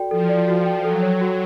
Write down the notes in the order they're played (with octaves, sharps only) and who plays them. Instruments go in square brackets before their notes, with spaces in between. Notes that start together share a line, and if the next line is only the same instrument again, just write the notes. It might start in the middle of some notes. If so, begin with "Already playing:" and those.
Already playing: [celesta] F#4 A4 D5 G5
[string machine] F3 [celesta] A4
[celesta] D5
F#4
G5
[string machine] F#3 [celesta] A4
[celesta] C#5
F#4